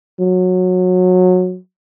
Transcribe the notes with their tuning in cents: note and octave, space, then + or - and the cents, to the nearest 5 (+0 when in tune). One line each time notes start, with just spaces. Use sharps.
F#3 -20